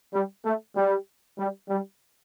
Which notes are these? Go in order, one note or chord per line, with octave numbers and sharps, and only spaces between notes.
G3
A3
G3
G3
G3